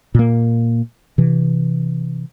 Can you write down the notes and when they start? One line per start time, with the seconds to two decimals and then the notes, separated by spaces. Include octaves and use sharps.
0.15 A#2 A#3
1.18 C3 E3